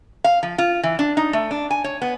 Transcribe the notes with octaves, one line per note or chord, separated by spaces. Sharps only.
F5
F3
F4
E3
D4
D#4
A3
D4
G#5
C#5
B3